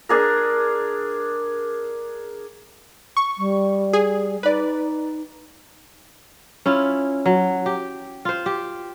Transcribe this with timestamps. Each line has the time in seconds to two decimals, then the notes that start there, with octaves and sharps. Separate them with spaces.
0.09 D4 G#4 A#4
3.17 C#6
3.37 G3
3.93 G#4
4.43 D#4 B4 D5
6.66 C#4 E4 F4
7.26 F#3
7.66 G4
8.25 F4 C5
8.46 G4